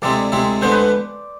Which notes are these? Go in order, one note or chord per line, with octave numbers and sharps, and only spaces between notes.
D2 C3 G#3 C4 E4 D5
D2 C3 G#3 C4 E4
D2 D3 G#3 B3 D4 C5
B4